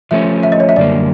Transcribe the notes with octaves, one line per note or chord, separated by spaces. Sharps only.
F3 A3 C#4 E5
E5
D#5
C#5
E5
F#2 D3 G3 A#3 D5